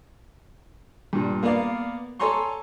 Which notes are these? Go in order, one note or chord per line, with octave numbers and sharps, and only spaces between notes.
G2 A#2
A#3 B3 A#4 D5 F5
A4 C#5 G#5 A#5 C6 C#6